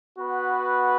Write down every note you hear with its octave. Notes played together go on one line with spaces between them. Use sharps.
B3 F#4 B4 F#5